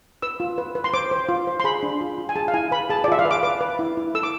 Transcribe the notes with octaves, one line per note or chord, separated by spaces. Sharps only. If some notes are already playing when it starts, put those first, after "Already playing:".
B4 E6
F4
B4
B4
C6
C5 D6
C5
F4
C5
C6
G#4 B5
D4
F4
F4
G#5
G#4 A5
F5
E4 G#5
B4 B5
G#4 A5
D5
F4 E5
F5
B4
D6
B4 D6
B4
E4
E4
A4 E6
D6